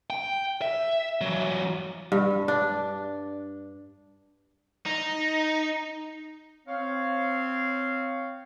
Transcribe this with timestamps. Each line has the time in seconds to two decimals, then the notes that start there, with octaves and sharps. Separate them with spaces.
0.10 G5
0.62 E5
1.21 E3 F#3
2.12 G2
2.48 D4
4.86 D#4
6.68 C4 C#5 F5